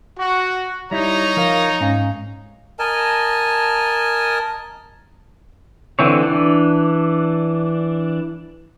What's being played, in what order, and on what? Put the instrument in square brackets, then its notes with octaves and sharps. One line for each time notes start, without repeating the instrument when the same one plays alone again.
[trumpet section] F#4
[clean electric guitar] G3 E4 [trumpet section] D#4 C#5 A#5
[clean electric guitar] F3 A#4 F5
G#2 C#4 F5
[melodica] A#4 D#5 G#5 A5
[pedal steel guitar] D3 E3 C4 C#5
E3 D4